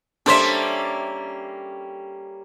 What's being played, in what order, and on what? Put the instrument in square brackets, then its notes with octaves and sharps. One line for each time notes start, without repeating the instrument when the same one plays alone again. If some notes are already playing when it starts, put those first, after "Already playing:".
[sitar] G3 A#3 C#4 [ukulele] D4 C5 [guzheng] A4 E5